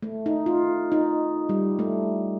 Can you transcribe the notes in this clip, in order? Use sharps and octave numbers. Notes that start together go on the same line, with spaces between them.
A3
D#4
F4
D#4
G3
A3